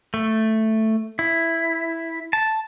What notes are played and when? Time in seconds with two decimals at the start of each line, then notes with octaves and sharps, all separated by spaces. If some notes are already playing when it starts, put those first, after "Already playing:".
0.14 A3
1.19 E4
2.33 A5